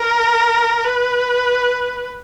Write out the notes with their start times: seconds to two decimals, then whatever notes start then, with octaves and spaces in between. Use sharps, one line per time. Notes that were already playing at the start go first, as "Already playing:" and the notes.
Already playing: A#4
0.84 B4